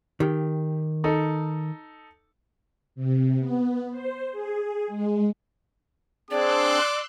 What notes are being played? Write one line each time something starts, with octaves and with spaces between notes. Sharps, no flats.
D#3 G4
D#4 A4
C3
B3
C5
G#4
G#3
C4 D4 G#4 D5 C6 D6 E6 F#6